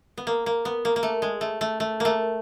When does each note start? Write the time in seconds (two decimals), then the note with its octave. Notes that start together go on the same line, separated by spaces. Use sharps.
0.18 B3
0.27 A#3
0.46 A#3
0.65 B3
0.85 A#3
0.96 A#3
1.03 A3
1.22 G#3
1.41 A3
1.61 A3
1.80 A3
2.00 A3 A#3